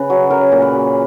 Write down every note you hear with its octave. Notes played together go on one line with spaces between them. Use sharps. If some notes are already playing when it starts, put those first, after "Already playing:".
Already playing: C#3 B4
F#3
F#3 A#4
A#2
B4
F#3